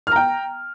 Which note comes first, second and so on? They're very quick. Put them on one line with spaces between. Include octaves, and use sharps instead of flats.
F6 A#5 G5